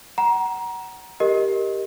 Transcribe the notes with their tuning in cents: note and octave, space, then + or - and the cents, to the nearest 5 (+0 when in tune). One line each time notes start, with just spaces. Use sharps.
F#5 +25 A#5 +25
G4 +0 A#4 +0 D#5 +0